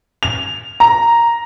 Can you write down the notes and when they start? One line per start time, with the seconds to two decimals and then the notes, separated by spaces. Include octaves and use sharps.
0.23 F7
0.80 A#5